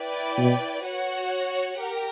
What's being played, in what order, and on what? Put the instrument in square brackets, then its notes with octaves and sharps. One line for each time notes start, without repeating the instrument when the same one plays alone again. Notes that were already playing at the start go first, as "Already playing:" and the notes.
Already playing: [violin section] E4 B4 D5 G5
[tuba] B2
[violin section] F#4 C#5 F#5
G4 A#4